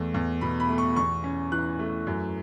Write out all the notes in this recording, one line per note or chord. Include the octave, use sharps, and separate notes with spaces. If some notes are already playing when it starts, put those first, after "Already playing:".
Already playing: E2 A3
E2
B2 B5
B5
A3
C#6
E2 C#6
C#4
E3 F#6
A3
F#2